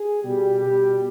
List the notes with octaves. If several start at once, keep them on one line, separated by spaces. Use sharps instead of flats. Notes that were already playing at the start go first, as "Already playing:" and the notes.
Already playing: G#4
B2 G3 G4
B2 G3